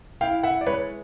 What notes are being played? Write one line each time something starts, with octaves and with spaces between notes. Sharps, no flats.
E4 F5 G5
E5 F#5
D5
G#3 B4 C#5